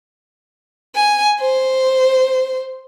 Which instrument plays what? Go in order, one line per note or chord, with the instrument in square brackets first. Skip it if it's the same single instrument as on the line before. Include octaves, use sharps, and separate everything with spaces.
[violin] G#5
C5